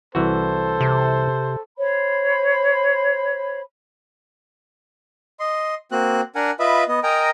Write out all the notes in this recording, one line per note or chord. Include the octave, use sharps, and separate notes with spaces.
C2 E3 F#4 A4 C5
C3
C5 C#5 B5
D#5 C6
A#3 C4 F#4 F#6
D4 A#4 F#5 G#5
F4 B4 D#5 E5 B5
B3 D#5
A#4 D#5 G5 G#5 A#5